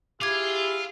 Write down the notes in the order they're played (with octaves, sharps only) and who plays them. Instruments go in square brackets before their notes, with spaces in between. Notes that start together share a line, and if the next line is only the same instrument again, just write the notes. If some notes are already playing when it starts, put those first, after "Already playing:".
[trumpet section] E4 G#4 [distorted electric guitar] F4 [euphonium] G4 [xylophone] D6 G#6